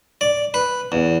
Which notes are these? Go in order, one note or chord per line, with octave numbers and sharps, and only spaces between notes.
D5
B4
E2